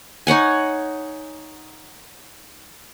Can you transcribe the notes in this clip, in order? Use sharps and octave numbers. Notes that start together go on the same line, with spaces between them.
D#4 C#5 F#5 G#5